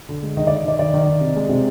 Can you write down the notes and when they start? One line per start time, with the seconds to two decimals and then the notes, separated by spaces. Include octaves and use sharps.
0.09 D3
0.23 G#3
0.37 D#3 D#5
0.47 D5
0.50 D#3
0.65 D#3 D5
0.79 D#3 D5
0.94 D#3
1.07 D#3
1.21 C3
1.36 G#3
1.49 C3